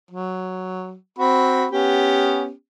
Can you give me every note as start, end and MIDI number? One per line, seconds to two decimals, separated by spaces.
0.11 0.95 54
1.19 1.66 60
1.19 1.66 66
1.19 1.66 83
1.71 2.51 59
1.71 2.51 61
1.71 2.51 67